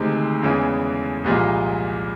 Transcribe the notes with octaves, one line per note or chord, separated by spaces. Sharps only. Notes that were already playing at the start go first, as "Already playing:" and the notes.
Already playing: D2 C3 D#3 G#3
E2 C#3 E3 G#3
C2 A#2 F3 G#3